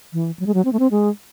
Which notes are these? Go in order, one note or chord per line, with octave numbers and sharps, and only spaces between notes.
E3
F#3
G#3
F#3
C4
A3
C4
G#3